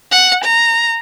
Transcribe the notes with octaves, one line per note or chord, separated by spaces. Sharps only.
F#5
A#5